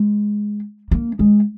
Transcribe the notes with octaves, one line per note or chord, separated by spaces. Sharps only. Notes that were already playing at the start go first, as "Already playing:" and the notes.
Already playing: G#3
A#3
G#3